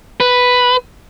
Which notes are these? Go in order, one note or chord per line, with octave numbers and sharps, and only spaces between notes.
B4